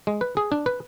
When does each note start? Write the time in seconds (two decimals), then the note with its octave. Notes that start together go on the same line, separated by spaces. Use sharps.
0.07 G#3
0.21 B4
0.37 G#4
0.52 D4
0.66 B4